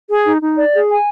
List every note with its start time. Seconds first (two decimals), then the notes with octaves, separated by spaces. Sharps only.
0.09 G#4
0.25 D#4
0.41 D#4
0.57 D5
0.73 G#4
0.90 G#5